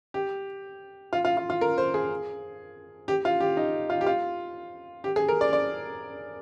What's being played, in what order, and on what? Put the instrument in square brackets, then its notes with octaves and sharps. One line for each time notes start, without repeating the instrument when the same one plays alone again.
[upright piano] G4
F4
F4
F4
F4
A#4
C5
G#4
G4
F4
G4
D#4
F4
G4
F4
G4
G#4
A#4
D5
D5